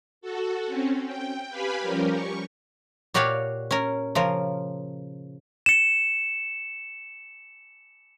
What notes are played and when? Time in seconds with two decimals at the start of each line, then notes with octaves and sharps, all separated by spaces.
0.21 F#4 A4
0.66 C4 C#4
1.05 G5
1.49 G4 B4 F5 G#5 B5
1.80 F3 G3 C#4 G4 A#4
2.11 C#6
3.14 A#2 F#4 G4 C#5 D5 F5
3.71 C#4 A#4
4.15 C#3 F3 A#4
5.66 C#7 E7